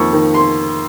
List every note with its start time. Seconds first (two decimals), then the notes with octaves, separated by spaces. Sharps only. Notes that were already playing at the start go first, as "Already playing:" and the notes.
Already playing: F2 D#3 A#3 C#6
0.13 D#3
0.34 C6